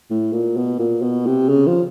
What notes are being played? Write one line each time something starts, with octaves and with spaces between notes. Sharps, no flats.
A2
A#2
B2
A#2
B2
C3
C#3
F3